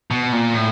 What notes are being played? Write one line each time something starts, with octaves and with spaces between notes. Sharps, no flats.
B2
A#2
A2